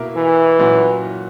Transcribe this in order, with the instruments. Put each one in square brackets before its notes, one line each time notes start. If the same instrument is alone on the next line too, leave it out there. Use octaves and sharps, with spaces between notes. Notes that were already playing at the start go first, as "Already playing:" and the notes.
Already playing: [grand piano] B2 A#3 E4 A#4 E5
[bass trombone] E3
[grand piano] A#2 F#3 C#4 F#4